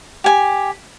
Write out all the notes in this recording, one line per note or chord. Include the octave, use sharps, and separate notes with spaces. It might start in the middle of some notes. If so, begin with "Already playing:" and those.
G4 G#5